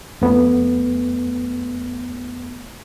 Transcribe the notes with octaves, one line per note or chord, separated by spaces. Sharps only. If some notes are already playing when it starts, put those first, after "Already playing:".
F2 A3 B3